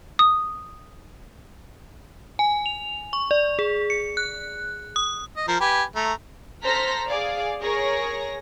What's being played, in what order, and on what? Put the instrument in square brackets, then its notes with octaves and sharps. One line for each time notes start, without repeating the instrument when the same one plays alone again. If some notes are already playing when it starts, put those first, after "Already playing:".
[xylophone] D#6
[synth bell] G#5
F7
C#6
D5
G#4
C#7
F#6
D#6
[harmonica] D#5
F3 A#4
G4 B4 G#5
A3 A#5
[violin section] A4 C5 A#5 F6 A#6 B6
G#4 D5 F5
G#4 A#4 C#5 A#6